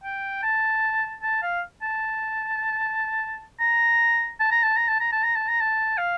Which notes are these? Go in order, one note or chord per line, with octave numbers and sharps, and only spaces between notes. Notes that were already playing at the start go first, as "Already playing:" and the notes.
G5
A5
A5
F5
A5
A#5
A5
A#5
A5
A#5
A5
A#5
A5
A#5
A5
A#5
A5
F5